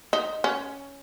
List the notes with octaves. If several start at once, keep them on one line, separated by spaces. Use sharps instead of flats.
D#4
C#4